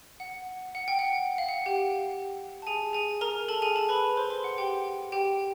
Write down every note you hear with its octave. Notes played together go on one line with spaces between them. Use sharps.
F#5
F#5
G5
F#5
F5
F#5
G4 G5
A5
G#4 G#5
G#4 G#5
A#4 A#5
A4 A5
G#4 G#5
A4 A5
B4 B5
C5 C6
C5 C6
F#5
G4 G5
G4 G5